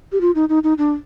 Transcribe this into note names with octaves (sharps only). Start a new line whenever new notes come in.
G4
F4
D#4
D#4
D#4
D4